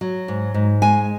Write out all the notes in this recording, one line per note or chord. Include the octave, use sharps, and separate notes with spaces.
F#3
G#2
G#2
G#3 G#5